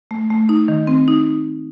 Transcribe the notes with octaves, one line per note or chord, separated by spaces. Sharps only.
A3
A3
D#4
D#3
C4
D#4